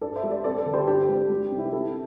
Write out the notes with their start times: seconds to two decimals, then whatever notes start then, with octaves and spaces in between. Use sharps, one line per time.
0.01 G2 A4 D5
0.16 C5 E5
0.23 G3
0.31 A4 D5
0.44 C4 A4 D5
0.58 A4 D5
0.66 D3
0.73 G4 C5
0.87 G2 G4
1.09 G3
1.30 G3
1.51 C3
1.58 E4
1.66 G4
1.72 C4 E4 A4